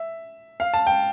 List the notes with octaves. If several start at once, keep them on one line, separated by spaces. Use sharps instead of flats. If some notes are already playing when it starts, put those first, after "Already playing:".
Already playing: E5
F5
A5
G5